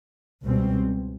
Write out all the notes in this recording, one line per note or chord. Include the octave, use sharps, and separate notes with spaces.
C#2 B2 G3 C4